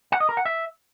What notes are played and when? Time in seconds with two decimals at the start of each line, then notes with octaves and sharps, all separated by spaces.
0.12 F#5
0.20 D#5
0.29 A#4
0.37 F#5
0.45 E5